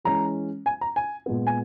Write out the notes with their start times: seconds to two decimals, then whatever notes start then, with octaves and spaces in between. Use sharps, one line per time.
0.04 E3 G#3 C#4 A#5
0.66 G#5
0.81 A#5
0.96 G#5
1.26 A#2 G#3 B3
1.47 G#5